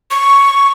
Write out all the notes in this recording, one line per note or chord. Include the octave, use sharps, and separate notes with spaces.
C#6